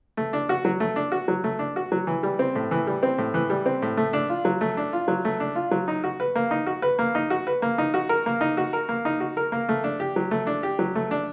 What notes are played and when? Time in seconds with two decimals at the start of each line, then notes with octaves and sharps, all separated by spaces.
0.17 A3
0.33 D4
0.49 F#4
0.65 F#3
0.80 A3
0.96 D4
1.12 F#4
1.28 F#3
1.44 A3
1.59 D4
1.76 F#4
1.92 F#3
2.07 E3
2.23 G3
2.39 C4
2.55 A2
2.71 E3
2.87 G3
3.03 C4
3.18 A2
3.34 E3
3.50 G3
3.66 C4
3.82 A2
3.97 A3
4.13 D4
4.29 F4
4.45 F#3
4.61 A3
4.77 D4
4.93 F4
5.08 F#3
5.25 A3
5.40 D4
5.55 F4
5.71 F#3
5.88 D#4
6.04 F#4
6.20 B4
6.35 A#3
6.51 D#4
6.67 F#4
6.82 B4
6.99 A#3
7.15 D#4
7.30 F#4
7.47 B4
7.62 A#3
7.78 D#4
7.94 F#4
8.09 A#4
8.26 A#3
8.41 D#4
8.57 F#4
8.73 A#4
8.89 A#3
9.05 D#4
9.20 F#4
9.37 A#4
9.52 A#3
9.69 A3
9.84 D4
10.00 G4
10.16 F#3
10.31 A3
10.47 D4
10.63 G4
10.79 F#3
10.95 A3
11.11 D4